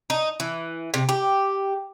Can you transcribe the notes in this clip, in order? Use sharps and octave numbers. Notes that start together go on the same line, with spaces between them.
D#4
E3
C3
G4